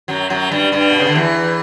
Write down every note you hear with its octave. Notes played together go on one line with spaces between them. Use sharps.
F#2 F#3
F#2 F#3
G2 G3
G2 G3
B2
C#3
D3
E2 E3